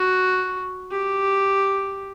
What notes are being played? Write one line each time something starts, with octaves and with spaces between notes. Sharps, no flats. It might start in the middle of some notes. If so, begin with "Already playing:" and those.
Already playing: F#4
G4